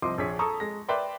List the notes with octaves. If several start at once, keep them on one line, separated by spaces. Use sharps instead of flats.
C2 F3 D#5 C6 D6
A#1 D4 G#4 C#5 B6
A4 A#5 C#6 D#6
G#3 A#6
B4 D5 E5 G5 C6